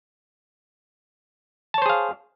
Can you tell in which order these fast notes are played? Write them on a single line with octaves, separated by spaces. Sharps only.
A5 C#5 C5 G#4 F5